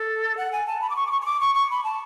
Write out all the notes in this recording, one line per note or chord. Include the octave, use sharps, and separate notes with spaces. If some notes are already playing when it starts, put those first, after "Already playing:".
Already playing: A4
F#5
G#5
A5
B5
D6
C#6
D6
C#6
C#6
D6
C#6
C#6
B5
A5